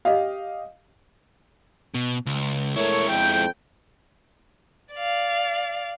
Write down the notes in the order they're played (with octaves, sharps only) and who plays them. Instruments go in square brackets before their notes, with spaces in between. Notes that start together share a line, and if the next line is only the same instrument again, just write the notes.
[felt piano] G4 D#5 F5
[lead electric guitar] B2
C#2
[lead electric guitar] G#3 E4 [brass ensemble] A3 A#4 C#5
[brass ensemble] F2 G5
[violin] D5 F5